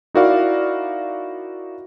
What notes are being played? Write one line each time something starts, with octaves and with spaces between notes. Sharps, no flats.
D#4 E4 F#4 A#4 D5 F5